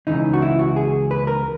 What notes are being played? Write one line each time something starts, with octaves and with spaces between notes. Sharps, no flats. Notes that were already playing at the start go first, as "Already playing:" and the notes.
C#2 C#3 E3 D#4
F#4
E4
F#4
G#4
B4
A#4